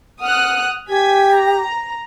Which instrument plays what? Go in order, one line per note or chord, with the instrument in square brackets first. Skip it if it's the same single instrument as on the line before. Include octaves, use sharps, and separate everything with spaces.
[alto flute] F#5 [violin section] D#6 F6 F#6
[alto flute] G4 [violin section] G#5 G#6 B6
[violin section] A#5